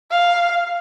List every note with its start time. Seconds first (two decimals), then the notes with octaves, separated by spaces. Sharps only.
0.11 F5